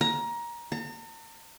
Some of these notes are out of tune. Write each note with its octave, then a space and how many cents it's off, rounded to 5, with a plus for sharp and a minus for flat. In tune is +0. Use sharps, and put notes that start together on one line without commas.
A#5 +20
A#5 -45